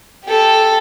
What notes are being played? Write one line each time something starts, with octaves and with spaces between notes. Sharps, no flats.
G4 A4